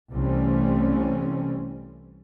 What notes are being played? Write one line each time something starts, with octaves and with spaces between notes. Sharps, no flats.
C2 E3 G3 A3 C4 C#4